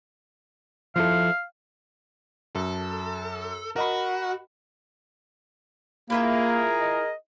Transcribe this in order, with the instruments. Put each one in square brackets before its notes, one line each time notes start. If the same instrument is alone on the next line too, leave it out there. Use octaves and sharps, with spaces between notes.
[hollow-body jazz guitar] F3 E4 A4 [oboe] F5
[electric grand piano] F#2 [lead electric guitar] A4
[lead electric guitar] F#4 [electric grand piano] A#4 D#5 B5
[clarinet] A#3 [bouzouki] E4 F4 E5 [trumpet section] G#4 A#4
[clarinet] D#5